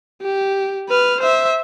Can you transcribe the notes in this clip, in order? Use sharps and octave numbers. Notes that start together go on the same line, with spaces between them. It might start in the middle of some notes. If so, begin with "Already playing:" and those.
G4
B4 F6
C5 E5